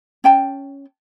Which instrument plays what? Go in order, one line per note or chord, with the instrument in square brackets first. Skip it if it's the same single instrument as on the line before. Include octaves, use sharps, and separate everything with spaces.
[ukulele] C#4 G5 A5